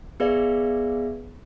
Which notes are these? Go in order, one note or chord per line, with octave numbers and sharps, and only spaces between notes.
B3 G#4 B4 D5 E5 F5